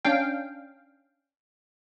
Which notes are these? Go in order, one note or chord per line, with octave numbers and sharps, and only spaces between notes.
C#4 D4 F5 G5